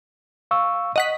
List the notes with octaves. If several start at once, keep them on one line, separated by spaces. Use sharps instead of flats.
F5 C#6 E6
D#5 F#5 B6